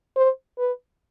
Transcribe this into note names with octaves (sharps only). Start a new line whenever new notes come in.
C5
B4